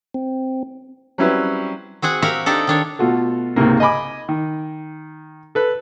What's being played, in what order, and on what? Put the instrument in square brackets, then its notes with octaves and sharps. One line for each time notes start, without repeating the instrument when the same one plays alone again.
[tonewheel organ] C4
[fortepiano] F#3 G3 C4 C#4 E4 B4
[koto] C4 F#4 G#4 F#5
F#4 G4 A#4 E5 F5
D4 D#4 G4 A4
D#3 D4 C#5
[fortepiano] B2 A3 F4 F#4 A4
C#2 G#2 C3 A#3
D#5 G#5 B5 D6
D#3
A4 B4